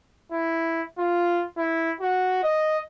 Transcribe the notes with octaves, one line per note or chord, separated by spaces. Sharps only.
E4
F4
E4
F#4
D#5